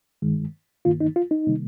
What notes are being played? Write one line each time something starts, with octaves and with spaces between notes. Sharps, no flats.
G2 D#3 G#3
G2 D#3 A#3 F4
D#4
F4
D#4
C3 D#3 G3 A#3